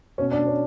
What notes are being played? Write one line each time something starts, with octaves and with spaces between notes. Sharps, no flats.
B2 C#4
D4
B2
C#4